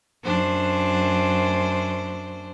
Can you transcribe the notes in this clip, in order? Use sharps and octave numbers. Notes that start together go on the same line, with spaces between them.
F#2 D4 C5